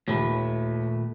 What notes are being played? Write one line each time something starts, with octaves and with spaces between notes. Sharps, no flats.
D#2 A#2 A3 B4